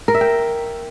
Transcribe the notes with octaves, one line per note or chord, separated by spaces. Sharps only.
A#4
E5
G5